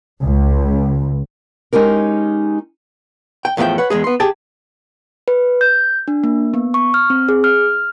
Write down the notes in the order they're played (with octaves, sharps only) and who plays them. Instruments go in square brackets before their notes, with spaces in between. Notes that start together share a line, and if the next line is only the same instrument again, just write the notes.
[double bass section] C#2
[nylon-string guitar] G#3 C#4 D#4 G4 A#4
[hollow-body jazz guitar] G5
E2 A2 F3 A#4 E5 G5
B4 C#5 F#5
E2 G#2 G#3 G#4
B3 C6
G4 G#4 G5 A5
[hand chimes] B4
G6
D4
A#3
B3
C#6
F6
C4
G#4
F6